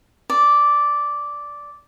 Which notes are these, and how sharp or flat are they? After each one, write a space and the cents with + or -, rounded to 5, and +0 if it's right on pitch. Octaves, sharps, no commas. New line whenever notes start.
D5 -5